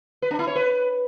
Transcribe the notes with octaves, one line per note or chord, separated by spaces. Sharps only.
B4
D4
E4
C#5
B4